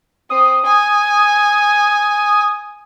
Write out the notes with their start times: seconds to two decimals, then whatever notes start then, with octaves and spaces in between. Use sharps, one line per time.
0.30 C4 D#6
0.65 G#5